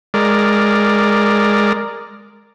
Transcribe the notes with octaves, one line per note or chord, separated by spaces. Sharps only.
G#3 A#4 D5